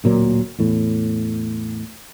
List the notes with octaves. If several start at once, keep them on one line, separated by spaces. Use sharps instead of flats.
D1 A#2 F#3 A#3
E2 A2